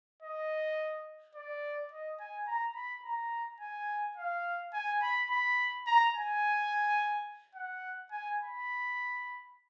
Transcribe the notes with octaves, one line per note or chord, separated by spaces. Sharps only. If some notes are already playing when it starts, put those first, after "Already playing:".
D#5
D5
D#5
G#5
A#5
B5
A#5
G#5
F5
G#5
B5
B5
A#5
G#5
F#5
G#5
B5